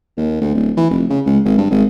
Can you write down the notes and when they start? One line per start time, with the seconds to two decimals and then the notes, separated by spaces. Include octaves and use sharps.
0.17 D#2
0.41 D2
0.54 D1
0.77 E3
0.90 F1
1.10 C#3
1.26 C#2
1.45 G#1
1.58 G2
1.71 G#1